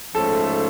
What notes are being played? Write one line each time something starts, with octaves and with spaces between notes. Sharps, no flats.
G#2 F3 A3 C#4 A4